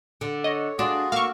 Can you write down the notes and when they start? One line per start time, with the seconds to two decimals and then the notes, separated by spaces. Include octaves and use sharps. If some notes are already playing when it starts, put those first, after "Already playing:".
0.21 D3
0.44 C#5 D#5
0.79 D4 F4 F#4 G#4
1.12 A#3 A#4 F5 C#6 D6 E6